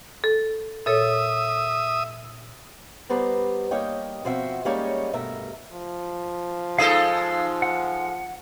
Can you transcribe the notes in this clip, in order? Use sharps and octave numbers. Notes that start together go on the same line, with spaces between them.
A4
A#2 A4 C#5 E5 D#6
G3 B3 B4 C5 D5 A#5
G3 A#3 D#4 C#5 D#5 G5
B2 F3 C4 F#4 C5 E5
G3 G#3 A#3 C#4 D#4 C#5
G2 B2 A3 A#4 E5 A#5
F3
G#3 D#4 A4 F5 D#6
F#5